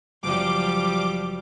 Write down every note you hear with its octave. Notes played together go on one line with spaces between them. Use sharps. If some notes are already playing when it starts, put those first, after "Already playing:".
F#1 F3 G3 D6